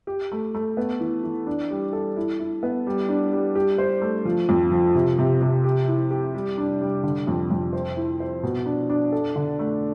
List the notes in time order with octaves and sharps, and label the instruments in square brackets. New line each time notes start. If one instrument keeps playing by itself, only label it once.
[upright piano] G4
A3
A3
B3
E3
E3
D4
G3
A4
E4
E4
B3
G3
D4
G3
G4
C5
A3
F3
F2
F3
C3
C3
C3
G4
E4
G4
G3
D4
G3
D3
F2
F2
C5
E4
C5
B2
D4
D4
A4
D3
A3